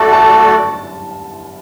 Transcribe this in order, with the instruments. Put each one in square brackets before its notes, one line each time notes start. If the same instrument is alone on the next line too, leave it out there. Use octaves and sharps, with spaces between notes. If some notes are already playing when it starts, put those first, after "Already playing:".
Already playing: [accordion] A3 F#4 A4 D5 [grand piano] A5
[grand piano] A5